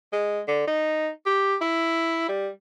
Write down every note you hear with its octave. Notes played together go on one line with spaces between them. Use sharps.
G#3
D3
D#4
G4
E4
G3